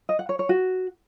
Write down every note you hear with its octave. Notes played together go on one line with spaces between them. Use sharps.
D#5
F#5
C#5
C#5
F#4